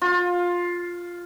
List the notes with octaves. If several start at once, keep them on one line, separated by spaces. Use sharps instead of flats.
F4